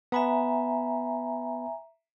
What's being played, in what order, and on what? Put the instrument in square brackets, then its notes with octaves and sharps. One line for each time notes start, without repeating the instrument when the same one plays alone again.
[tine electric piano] B3 B5 [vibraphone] E5 G#5 A#5